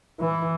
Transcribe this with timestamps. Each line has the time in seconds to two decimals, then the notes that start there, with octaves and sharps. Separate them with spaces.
0.21 E3